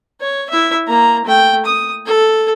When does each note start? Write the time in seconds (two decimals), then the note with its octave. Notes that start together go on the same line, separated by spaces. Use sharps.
0.21 C#5
0.50 E4 E5
0.87 A#3 A#5
1.24 A3 G5
1.65 D#6
2.06 A4